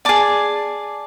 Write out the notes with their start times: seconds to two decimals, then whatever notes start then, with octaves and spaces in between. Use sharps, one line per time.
0.05 G#4 D5 A5